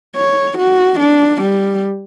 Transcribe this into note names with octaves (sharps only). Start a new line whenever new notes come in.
C#5
F#4
D4
G3